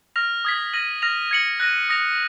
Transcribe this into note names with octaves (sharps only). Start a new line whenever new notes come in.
F6 A#6 F7
D#6 G#6 B6
F6 A#6 D#7 F#7
F6 A#6 F7
G#6 C#7 F#7
F#6 A#6 D#7
D#6 A#6 F7